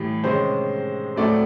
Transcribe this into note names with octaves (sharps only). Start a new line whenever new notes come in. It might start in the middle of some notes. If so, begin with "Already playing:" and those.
Already playing: A2 E3 G3
C3 D#3 G#3 C#4 C5
A2 F#3 A3 C4 D5